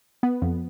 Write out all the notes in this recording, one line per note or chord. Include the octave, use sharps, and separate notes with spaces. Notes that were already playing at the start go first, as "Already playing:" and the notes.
B3
F2